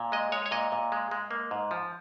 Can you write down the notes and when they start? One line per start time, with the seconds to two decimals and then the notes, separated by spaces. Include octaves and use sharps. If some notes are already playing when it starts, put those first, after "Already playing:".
Already playing: A#2
0.12 G#3 D#5
0.32 G#3 C#5
0.46 C#5
0.51 A#2 D#5
0.72 A#2
0.92 G#3
1.11 G#3
1.31 A#3
1.51 G#2
1.71 F3